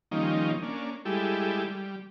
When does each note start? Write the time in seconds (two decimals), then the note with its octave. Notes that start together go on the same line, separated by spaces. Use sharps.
0.11 D#3 F3 G3 A#3 C#4 D#4
0.63 A#3 C#4 D4
1.05 G3 G#3 E4 G4 A4
1.64 G3